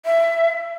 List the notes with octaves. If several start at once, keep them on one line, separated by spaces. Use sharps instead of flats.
E5